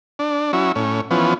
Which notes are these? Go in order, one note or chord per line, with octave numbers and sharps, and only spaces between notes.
D4
F#3 C#4 E4
A2 C#4
E3 F3 B3 C#4